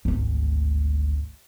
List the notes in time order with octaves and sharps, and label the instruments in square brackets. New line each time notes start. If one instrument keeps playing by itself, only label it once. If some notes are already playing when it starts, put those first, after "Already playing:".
[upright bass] G#1 D2